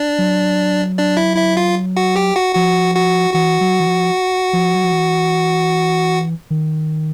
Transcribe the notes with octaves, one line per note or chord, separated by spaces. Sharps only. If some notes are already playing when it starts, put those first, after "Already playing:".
Already playing: D4 D5
F#3
D4 D5
E4 E5
E4 E5
F4 F5
F#4 F#5
G4 G5
F#4 F#5
F3 F#4 F#5
F#4 F#5
E3 F#4 F#5
F#3
E3
F3
F3
F#3
F3
E3
D#3